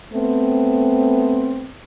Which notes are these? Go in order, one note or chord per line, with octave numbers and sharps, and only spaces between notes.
A3 B3 C4